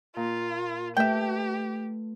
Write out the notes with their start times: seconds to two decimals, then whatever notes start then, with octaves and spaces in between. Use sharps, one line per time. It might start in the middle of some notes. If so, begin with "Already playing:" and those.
0.16 A#2 F4
0.97 A3 G4 B4 E5 G5